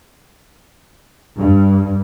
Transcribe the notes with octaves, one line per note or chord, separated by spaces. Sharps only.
G2